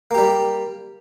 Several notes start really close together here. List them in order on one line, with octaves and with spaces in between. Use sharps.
A#3 G4 G3